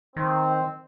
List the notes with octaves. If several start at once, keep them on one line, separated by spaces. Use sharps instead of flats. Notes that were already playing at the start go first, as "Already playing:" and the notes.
D#3 C4